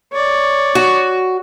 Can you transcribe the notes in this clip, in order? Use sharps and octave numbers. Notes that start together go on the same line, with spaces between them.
C#5 D5
F#4